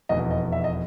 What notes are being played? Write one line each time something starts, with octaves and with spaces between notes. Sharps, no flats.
F1 E2 B2 D#5
D#5
E5
D#5